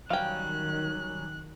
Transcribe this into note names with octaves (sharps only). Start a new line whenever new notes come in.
D#3 F#3 G3 C#4 F5 G5 F#6